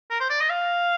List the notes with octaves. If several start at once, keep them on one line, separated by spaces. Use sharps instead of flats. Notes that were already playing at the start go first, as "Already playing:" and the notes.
A#4
C5
D5
D#5
F5